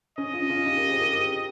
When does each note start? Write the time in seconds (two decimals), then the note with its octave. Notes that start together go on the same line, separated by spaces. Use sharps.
0.18 C#4 D#5
0.33 C#4 F4
0.50 C#4 F4
0.65 D#4 G4
0.77 G4 A#4
0.89 G#4 C5
1.01 G4 A#4
1.13 G4 A#4